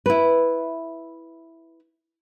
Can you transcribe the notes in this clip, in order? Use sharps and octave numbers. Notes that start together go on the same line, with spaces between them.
E4 B4